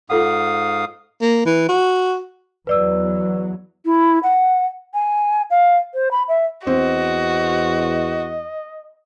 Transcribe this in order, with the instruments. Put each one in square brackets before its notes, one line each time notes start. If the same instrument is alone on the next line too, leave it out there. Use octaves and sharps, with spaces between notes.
[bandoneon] G#2 F5 D#6 [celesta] F4 A4 F#5
[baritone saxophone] A#3
E3
F#4
[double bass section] E2 F#3 [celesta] B4 D5 E6
[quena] E4
F#5
G#5
F5
C5
B5
E5
[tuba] E2 [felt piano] C4 [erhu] F#4 [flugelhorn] D#5